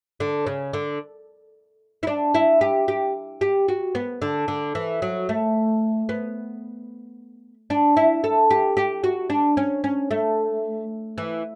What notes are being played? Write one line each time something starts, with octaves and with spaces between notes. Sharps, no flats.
D3
C#3
D3
E4
D4
E4
G4
G4
G4
F#4
B3
D3
D3
E3
F#3
A3
B3
D4
E4
A4
G4
G4
F#4
D4
C#4
C#4
A3
E3